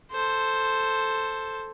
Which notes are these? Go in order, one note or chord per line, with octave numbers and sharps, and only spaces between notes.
A4 C5